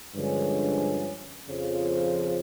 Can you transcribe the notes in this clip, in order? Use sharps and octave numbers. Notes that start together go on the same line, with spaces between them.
G2 D3 F3 G#3 C#4
F2 C#3 F3